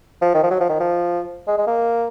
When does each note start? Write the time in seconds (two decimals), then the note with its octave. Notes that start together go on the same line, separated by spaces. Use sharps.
0.22 F3
0.34 D#3
0.43 F3
0.51 F#3
0.61 F3
0.69 D#3
0.80 F3
1.47 G#3
1.58 G#3
1.67 A#3